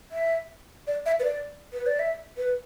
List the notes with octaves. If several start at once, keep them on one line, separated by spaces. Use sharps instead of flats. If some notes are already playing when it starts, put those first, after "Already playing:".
E5
D5
E5
B4
D5
B4
D5
E5
B4